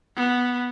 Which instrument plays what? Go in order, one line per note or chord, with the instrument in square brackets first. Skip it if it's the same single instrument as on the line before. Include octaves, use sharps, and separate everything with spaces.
[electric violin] B3